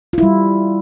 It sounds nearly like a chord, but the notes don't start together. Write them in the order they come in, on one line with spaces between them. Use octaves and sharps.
F4 E4 G3